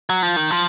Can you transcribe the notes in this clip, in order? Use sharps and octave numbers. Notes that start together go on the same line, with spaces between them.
F#3
F3
D#3
F3